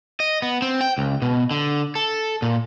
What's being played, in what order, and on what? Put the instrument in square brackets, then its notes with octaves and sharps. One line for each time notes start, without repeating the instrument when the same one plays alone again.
[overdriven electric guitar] D#5
B3
C4
G5
C#2
B2
D3
A4
A#2